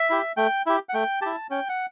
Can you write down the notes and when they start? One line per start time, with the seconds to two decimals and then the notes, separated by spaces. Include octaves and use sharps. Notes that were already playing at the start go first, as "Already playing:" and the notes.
Already playing: E5
0.10 E4 G4
0.37 A3 G5
0.66 E4 G4
0.89 F#5
0.94 A3 G5
1.22 E4 G4 A5
1.50 C#4 G5
1.69 F#5